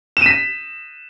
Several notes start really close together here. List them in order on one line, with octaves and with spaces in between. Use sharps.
E7 D#7 B6